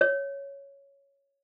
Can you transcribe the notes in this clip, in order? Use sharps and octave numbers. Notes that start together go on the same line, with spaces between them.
C#5